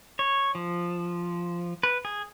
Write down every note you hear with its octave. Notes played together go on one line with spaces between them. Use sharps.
C#5
F3
B4
G#4